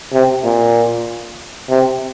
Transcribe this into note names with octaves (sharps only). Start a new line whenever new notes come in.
C3
A#2
C3